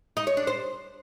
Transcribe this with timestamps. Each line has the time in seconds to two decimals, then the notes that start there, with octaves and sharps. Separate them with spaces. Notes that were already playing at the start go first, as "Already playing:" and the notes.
0.17 D#4
0.27 C#5
0.37 D4
0.47 C5